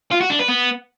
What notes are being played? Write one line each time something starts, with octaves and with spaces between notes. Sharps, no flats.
F4
F#4
D4
B4
B3